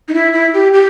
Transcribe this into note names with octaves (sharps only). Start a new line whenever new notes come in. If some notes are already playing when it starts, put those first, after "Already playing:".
D#4
E4
E4
G4
G4